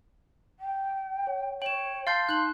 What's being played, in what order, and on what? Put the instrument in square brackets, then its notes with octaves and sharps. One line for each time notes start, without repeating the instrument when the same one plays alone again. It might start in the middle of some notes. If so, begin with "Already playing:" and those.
[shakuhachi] G5
[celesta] C#5
[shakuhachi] C#5 [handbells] G5 [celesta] E7 F#7
[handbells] F5 C6 G6 [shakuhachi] A5 [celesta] A6 C7
[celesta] D#4 C6 F#7 [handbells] F#6